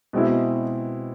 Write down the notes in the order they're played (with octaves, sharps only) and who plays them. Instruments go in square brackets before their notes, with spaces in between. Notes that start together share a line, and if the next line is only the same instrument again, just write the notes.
[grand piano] B2 G#3 C4 E4